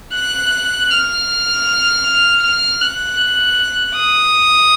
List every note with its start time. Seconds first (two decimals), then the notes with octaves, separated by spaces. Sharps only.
0.14 F#6
0.91 F6
2.43 F6
2.81 F#6
3.97 D#6